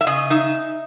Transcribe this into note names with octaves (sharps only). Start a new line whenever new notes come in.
E5
C#3 D#5
D#4 E5